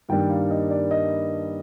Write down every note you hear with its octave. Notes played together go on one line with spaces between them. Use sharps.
G2 D#3 G3 A#3 D4 G5
F5
D#5
D5
D#5